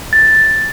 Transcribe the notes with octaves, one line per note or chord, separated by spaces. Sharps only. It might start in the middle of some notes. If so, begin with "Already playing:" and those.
A6